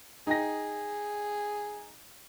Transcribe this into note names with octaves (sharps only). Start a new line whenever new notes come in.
D#4 G#4 G5 A#6